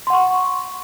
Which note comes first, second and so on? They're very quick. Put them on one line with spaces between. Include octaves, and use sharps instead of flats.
C6 F#5 C#6